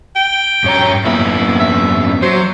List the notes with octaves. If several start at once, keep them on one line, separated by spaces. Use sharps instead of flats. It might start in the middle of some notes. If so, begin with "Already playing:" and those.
G5
G2 C#5 A#5
F#2 A#3 B3 E4
E5
F#3 C5